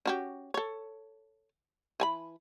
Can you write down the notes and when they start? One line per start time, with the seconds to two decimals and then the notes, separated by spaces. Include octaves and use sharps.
0.06 C#4 F#4 G4
0.54 A4 C#5
2.00 E3 G#5 B5